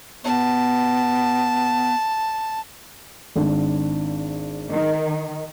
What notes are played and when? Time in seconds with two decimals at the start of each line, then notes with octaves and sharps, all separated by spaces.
0.24 B3 A5
3.36 G#1 D4
4.69 D#3